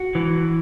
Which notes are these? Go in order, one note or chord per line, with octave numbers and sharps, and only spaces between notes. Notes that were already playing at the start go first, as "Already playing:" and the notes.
Already playing: F#4
E3